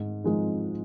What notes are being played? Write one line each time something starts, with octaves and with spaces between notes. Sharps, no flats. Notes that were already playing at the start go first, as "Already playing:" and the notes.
Already playing: G#2
F3 G#3 D#4